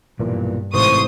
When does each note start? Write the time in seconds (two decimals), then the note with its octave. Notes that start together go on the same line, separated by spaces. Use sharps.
0.19 B1 G2 A#2 E3
0.74 A1 G#2 C3 E3 C5 C#6 D#6